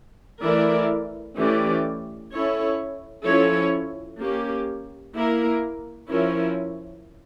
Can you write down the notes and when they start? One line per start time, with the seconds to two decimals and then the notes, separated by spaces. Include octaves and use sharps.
0.42 E3 A3 E4 A#4 D5
1.36 E3 A3 C#4 G4 D5
2.30 C#4 E4 A4 C#5
3.26 F3 C#4 E4 A4 C#5
4.20 A#3 C#4 G4
5.15 A#3 E4 A#4
6.09 F3 C#4 E4 A#4 C#5